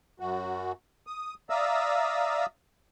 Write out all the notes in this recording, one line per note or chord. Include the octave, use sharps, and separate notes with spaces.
F#2 F#4
D#6
D5 E5 F5 A#5 D#6 E6